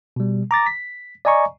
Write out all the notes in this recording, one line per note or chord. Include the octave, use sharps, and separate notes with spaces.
B2 G3
A#5 D6 A6 A#6
B6
D5 D#5 G#5 A#5 C#6